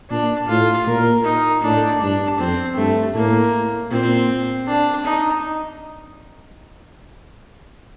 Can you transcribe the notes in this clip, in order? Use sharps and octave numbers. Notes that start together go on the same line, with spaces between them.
A#2 D4
A2 F4
A#2 A#4
D#4
A2 D4
G2 D4
F2 C4
G2 A3
A2 A#3
A#2 C4
D4
D#4